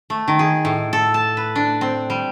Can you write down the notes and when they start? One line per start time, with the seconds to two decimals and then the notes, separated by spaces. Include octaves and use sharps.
0.10 A3
0.28 D#3
0.39 G#4
0.65 A2
0.93 A4
1.14 A5
1.37 B4
1.55 D4
1.81 C4
2.10 G3